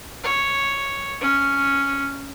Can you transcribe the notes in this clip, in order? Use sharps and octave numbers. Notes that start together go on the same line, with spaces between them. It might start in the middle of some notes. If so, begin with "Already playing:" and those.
C#5
C#4